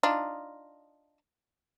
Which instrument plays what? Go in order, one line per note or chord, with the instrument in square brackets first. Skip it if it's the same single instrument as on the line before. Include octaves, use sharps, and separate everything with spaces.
[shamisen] D4 D#4 F4